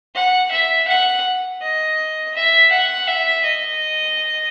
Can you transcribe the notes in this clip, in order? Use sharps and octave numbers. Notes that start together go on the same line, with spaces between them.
F#5
E5
F#5
D#5
E5
F#5
E5
D#5